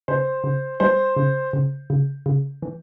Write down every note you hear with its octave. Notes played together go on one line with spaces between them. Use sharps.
C#3 C5
C#3
G3 C5
C#3
C#3
C#3
C#3
E3